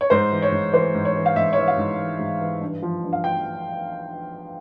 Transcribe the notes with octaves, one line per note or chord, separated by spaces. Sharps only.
C#5
G#2 C5
E3
C#5
G#2
E3 C5
G#2
C#5
E3
F5
G#2 E5
C#5
E3 E5
F5
G#2
E3
G#2
E3
G2
F3
G2
F5
F3 G5